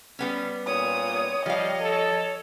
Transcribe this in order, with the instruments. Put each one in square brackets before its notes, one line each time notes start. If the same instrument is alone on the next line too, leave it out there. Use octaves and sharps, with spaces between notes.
[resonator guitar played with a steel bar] G3 B3 C#4
[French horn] A#2 [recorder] C#5 [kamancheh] D#6
[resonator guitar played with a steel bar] F3 F5 [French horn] G3 [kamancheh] D#5
[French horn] A4